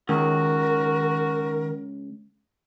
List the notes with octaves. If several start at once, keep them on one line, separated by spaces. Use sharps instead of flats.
C#2 D#3 F#4 A#4